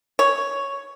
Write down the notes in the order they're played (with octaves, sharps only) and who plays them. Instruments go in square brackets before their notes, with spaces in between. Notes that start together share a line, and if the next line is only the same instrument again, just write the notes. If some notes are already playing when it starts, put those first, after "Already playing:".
[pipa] C#5